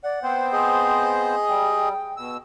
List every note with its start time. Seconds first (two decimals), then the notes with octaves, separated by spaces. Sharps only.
0.04 D5 F#5
0.23 B3 C4 C5 G5
0.52 G#4 D#5
1.49 G3 G5
2.17 B2 E6